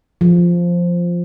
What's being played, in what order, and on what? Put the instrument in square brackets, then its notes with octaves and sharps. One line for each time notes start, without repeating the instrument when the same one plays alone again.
[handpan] F3